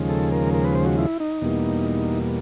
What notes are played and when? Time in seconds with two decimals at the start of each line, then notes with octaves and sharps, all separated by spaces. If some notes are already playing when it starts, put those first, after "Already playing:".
Already playing: D#2 C#3 F3 G#3
0.09 A4
0.32 A#4
0.54 A#4
0.64 B4
0.75 C5
0.86 F#4
0.98 E4
1.20 D#4
1.41 E2 B2 G3 A#3